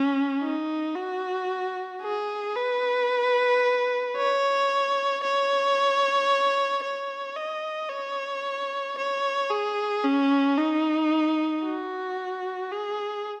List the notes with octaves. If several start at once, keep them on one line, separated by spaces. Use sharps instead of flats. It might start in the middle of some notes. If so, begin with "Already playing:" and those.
Already playing: C#4
D#4
F#4
G#4
B4
C#5
C#5
C#5
D#5
C#5
C#5
G#4
C#4
D#4
F#4
G#4